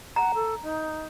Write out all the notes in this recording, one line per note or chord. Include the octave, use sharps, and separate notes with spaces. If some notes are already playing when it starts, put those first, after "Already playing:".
F#5 A#5
A4
D#4